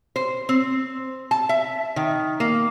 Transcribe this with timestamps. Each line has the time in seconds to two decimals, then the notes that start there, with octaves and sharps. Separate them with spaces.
0.16 C5
0.49 C4
1.31 A5
1.49 E5
1.96 D#3
2.40 A#3